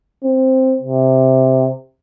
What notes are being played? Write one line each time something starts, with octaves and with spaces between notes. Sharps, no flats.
C4
C3